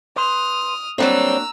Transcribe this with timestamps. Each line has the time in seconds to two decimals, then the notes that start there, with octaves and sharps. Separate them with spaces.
0.16 B4 C6 D#6 F6
0.98 F#3 G3 A#3 C4 D4 F#4 A#5 E6